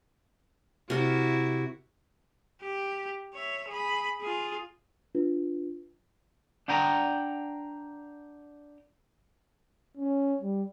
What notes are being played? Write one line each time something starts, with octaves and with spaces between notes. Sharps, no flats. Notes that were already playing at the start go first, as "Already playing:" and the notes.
C3 E4 F#4 A#4
G4
C#5 E5
G#4 B5
F4 G#4
D4 F4 B4
D4 F#5 G5 A#5
C#4
G3